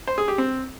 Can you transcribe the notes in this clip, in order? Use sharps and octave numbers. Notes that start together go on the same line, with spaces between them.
C5
G#4
G4
C4